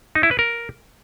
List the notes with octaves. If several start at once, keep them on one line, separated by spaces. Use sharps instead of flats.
D#4
E4
B4
A#4